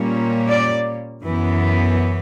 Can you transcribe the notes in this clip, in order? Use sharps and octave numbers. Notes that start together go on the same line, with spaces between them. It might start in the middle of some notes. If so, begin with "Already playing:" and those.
Already playing: A#2 G3 A#3 C#4
D5
F#2 E3 B3